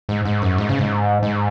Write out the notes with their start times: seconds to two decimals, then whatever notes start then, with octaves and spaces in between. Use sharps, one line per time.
0.09 G#2
0.25 G#2
0.42 F#2
0.58 G#2
0.69 C#3
0.79 G#2
1.23 G#2